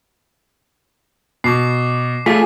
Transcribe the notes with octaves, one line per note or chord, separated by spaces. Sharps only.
B2 D6 C7
A3 F4 G#4 G#5 B6